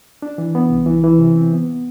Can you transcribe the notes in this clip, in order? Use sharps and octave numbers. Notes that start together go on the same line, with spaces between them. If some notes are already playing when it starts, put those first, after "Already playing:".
D4
E3
B3
C2
E3
E3
C3
C4
B3